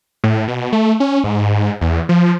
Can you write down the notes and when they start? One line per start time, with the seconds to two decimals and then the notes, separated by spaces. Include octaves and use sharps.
0.24 A2
0.48 B2
0.73 A3
1.00 C#4
1.24 G#2
1.81 E2
2.09 F3